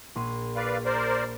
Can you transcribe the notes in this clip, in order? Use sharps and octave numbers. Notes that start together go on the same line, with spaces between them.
A#1 C6 D#7
B4 D5 F5
A#4 C5 D5